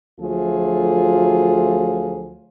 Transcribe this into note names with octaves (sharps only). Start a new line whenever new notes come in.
D2 F3 F#3 A3 F4 G#4